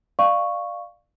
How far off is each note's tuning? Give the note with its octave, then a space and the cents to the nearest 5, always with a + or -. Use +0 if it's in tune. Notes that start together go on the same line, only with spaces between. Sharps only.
D5 +25 F5 +0 C#6 +0